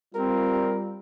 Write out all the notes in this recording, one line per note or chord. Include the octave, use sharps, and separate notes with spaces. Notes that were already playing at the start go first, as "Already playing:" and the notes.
G3 C4 F4 A#4